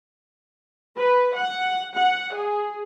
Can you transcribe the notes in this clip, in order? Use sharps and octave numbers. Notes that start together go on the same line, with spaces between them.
B4
F#5
F#5
G#4